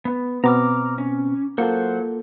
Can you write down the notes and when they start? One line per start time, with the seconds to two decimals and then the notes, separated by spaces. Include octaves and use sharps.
0.05 B3
0.44 B2 B3 C4 A#5 D6 F6
0.98 C#4
1.58 F#3 A#3 F4 A4 C5 F#5